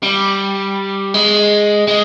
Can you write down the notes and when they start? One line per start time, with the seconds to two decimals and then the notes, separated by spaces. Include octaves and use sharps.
0.03 G3
1.14 G#3
1.88 G#3